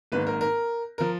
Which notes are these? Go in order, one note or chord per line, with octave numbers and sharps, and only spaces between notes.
G#1 G#2 D#3 A#3 B4
A#4
A#4
F3 A#4